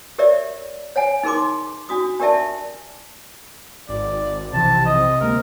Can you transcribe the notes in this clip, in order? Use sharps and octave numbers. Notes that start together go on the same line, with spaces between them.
G4 A#4 C#5 D5 E5
C#5 F#5 G#5
D#4 G#4 A#4 C6 D6
D4 F#4 D#6
D4 G4 A#4 D5 E5 A5
G#1 D5
B1 C3 E3 F3 A5
D#5
D2 G#3 A#3 A#4